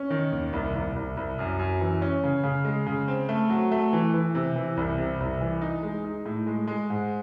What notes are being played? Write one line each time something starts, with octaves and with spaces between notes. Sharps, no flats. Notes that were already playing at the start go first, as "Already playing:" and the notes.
Already playing: C#4
D#3
D#2
C2
C2
C2
C2
F#2
F#2
E3
C#4
C#3
C#3
G#3
C#3
C4
A3
F#3
A3
E3
E3
C3
E3
C2
C3
C2
E3
D#4
G#3
D#4
A2
G#3
G#3
G#2